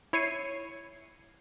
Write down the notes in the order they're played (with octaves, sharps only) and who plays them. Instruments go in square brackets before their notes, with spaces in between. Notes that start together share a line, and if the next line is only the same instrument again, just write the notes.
[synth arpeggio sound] E4 C#5 G#6 C7 C#7 D#7